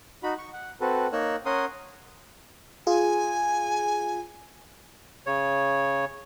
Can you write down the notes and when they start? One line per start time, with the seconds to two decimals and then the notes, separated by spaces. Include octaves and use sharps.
0.23 D#4 F#4 B5
0.38 C#6
0.53 F#5
0.81 C4 F#4 A4 B4
1.13 A#3 D#4 A#4 C#5 E6 F#6
1.46 C#4 A#4 F#5 C6 D#6
2.87 F4 G#4 G#5
5.26 C#3 C#5